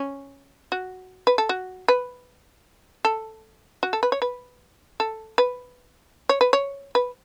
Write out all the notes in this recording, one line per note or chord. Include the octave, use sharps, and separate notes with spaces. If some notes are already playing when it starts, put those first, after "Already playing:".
Already playing: C#4
F#4
B4
A4
F#4
B4
A4
F#4
A4
B4
C#5
B4
A4
B4
C#5
B4
C#5
B4